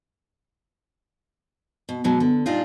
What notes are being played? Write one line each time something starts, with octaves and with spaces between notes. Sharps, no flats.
B2
B2 F#3 G#3
D3
A#2 G3 D4 D#4 F4